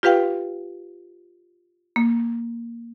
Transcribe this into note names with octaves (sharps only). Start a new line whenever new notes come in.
F4 G4 B4 F5 G5
A#3